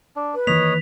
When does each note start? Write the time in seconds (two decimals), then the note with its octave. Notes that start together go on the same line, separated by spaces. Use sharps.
0.16 D4
0.35 B4
0.47 D#3 E3 A#3 C#5 D#5 B6 F7